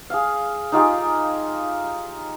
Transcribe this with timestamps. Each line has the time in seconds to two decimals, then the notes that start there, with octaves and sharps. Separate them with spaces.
0.10 G#4 F5
0.72 D#4 F4 G4 G#4